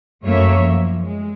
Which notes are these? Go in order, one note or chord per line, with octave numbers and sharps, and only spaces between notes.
F#2 A3 A#3 C#5 E5
F3
G#3